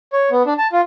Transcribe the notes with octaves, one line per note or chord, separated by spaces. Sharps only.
C#5
B3
D4
A5
F4